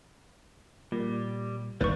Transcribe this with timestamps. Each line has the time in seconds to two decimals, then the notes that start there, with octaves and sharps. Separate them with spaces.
0.92 A#2 G3
1.81 G1 D#2 A#3 B4 D5 C#6 G6